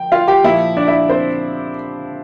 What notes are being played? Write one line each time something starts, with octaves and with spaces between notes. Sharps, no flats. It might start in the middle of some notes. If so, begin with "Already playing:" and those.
Already playing: F3 G5
F4 F5
G4 G5
A#2 F3 E4 E5
D4 D5
E4 E5
C4 C5